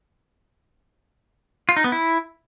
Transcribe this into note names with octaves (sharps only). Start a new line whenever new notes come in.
F4
D#4
B3
E4